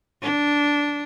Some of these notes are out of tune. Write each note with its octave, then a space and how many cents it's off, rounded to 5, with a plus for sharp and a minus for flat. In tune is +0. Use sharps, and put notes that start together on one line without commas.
D4 -10